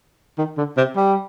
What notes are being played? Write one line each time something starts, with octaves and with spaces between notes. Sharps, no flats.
D#3
D3
C3
G3